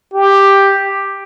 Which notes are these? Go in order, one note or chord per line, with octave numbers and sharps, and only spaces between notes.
G4